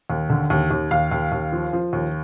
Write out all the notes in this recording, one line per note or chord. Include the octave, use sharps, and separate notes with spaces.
D#2
D3
D#2
D#2
D#2 F5
D#2
D#2
F3
F3
D#2